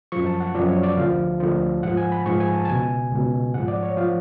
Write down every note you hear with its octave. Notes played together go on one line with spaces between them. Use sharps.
F#2 F3 C#6
A5
F#5
F#2 F3 D5
C#5
D5
D2 D3 F3 F5
D2 D3 F3
G#2 F3 F#5
G#5
B5
G#2 F3 C#6
G#5
A5
A5
C#2 B2 G#5
C#2 B2
G#2 F3 F#5
D5
C#5
F3 F5